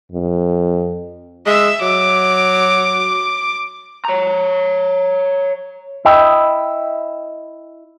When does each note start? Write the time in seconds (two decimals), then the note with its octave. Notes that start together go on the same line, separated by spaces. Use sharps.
0.12 F2
1.46 G#3 E5 E6
1.81 F#3 D6
4.05 C#5 A#5
6.05 E4 D#5 G5